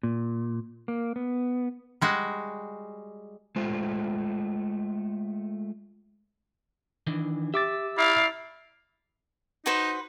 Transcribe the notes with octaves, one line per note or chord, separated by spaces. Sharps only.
A#2
A#3
B3
G3 G#3 F#4
G#3 A3 F4 C5
D#3 E3 D4
G4 E5 D6 A6
E4 D5 F5
D#4 F#4 B4 C5